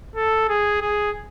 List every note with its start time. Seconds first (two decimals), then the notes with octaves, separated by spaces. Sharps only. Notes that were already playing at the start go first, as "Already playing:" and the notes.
0.16 A4
0.49 G#4
0.81 G#4